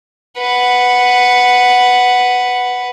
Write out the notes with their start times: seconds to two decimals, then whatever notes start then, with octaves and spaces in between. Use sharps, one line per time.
0.38 B4 F#5